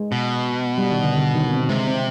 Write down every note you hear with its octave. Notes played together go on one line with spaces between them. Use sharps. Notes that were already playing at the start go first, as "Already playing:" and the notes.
Already playing: G#3
B2
G3
D#3
D3
D3
D#3
C4
C3 G#3
C4